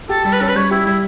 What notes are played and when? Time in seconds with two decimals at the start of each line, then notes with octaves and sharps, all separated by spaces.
0.09 G4 A4
0.24 G3 A4
0.33 B4
0.41 C#4 A4
0.49 B4
0.56 G3 C#5
0.71 E4 G4
0.86 G3 E4